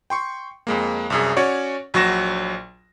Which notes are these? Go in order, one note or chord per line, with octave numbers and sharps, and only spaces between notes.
G5 C6 C#6
F2 G#3 A#3
C2 F#2 G#4
C#4 F#4 C#5 D5
A#1 F#3 F#4 C#6 A#6 E7